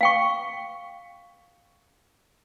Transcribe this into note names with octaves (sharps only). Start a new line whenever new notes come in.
F5 G5 C#6